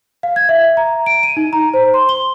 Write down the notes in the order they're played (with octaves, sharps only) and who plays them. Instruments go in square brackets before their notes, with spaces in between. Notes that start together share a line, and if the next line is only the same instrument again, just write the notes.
[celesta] F5
G#6
E5
A#5
D7
D#7
D#4
A#5
C5
C6
G7